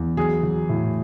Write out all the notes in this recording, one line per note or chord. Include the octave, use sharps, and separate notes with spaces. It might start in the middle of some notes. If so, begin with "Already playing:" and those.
Already playing: E2
F#3 G#4
F#3
A2